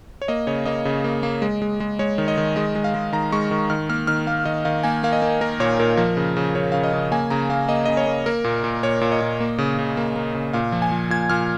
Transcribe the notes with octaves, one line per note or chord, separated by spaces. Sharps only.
C#5
A#3 D#5
C#3 C#5
A#3 D#5
C#3
A#3
A#3
G#3
G#3
G#3
G#3 C#5
D#3
D#5
D#3
G#3 D#5
G#3
F5
G#3
D#3 A#5
G#3 C#6
D#3
D#3 F6
A#3 F6
D#3 F6
A#3 F5
D#3 D#5
D#3 F5
A#3 G#5
A#3 F5
D#5
A#3
A#3 A#4
A#2 C#5
A#2 A#4
F3 A#4
C#3
C#3
C#3 C#5
C#3 F5
D#5
C#3
A#3 G#5
C#3 A#5
A#3 F5
A#3 D#5
C#3 D#5
C#5
A#3
A#3 A#4
A#2
A#2
A#2 C#5
A#2
D#5
A#2
A#3
C#3
C#3
A#3
A#3
C#3
A#2 F5
F3
G#5
F3
A#2 G#6
A#2 F6